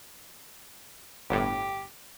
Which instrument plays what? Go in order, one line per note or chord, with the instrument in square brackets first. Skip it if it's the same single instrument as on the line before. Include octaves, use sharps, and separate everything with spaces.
[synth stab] G1 A2 [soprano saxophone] G4